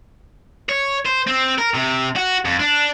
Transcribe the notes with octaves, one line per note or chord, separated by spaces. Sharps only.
C#5
C5
C4
A#4
C3
F#4
F2
D4